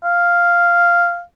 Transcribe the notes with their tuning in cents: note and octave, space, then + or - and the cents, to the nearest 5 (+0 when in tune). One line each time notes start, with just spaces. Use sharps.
F5 -5